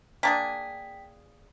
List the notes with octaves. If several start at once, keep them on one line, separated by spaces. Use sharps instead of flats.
A#3 D4 G#4 G5 B6